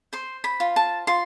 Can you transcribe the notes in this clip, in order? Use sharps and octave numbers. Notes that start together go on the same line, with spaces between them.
C5 C6
B5
F4
A5
F4 C6